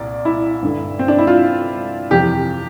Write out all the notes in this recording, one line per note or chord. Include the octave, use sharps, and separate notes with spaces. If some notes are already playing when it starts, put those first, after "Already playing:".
Already playing: C2 A#2 D5
E4
G2 D3
C4
D4
E4
F4
F2 C3 E3 G4